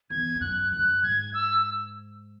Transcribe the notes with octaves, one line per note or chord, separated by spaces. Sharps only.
E2 G#6
E2
F#2 F#6
F#2 F#6
G#2 G#6
E6